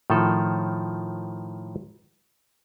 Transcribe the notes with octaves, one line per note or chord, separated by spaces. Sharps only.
A2 D#3 F3 A4